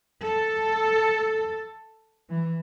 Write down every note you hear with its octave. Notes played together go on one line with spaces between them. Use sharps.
A4
E3